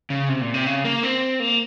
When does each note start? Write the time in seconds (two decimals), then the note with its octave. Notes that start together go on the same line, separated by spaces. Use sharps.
0.10 C#3
0.29 C3
0.41 A#2
0.54 C3
0.66 C#3
0.85 A#3
1.03 C4
1.40 A#3